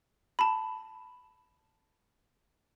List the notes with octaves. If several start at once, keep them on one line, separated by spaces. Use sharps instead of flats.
A5 B5